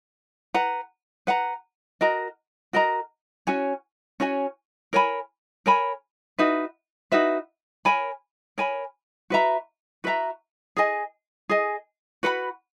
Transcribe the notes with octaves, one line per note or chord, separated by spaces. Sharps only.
B4 F#5 A#5
B4 F#5 A#5
F#4 A#4 D#5 A#5
F#4 A#4 D#5 A#5
C#4 F#4 C#5 G#5
C#4 F#4 C#5 G#5
A#4 C#5 G#5 B5
A#4 C#5 G#5 B5
D#4 F#4 B4 E5
D#4 F#4 B4 E5
A#4 C#5 G#5 B5
A#4 C#5 G#5 B5
F#4 B4 E5 A#5
F#4 B4 E5 A#5
G#4 D#5 G#5
G#4 D#5 G#5
F#4 B4 F#5 B5